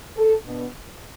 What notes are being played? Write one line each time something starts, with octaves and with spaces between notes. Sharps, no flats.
A4
B2 B3 D4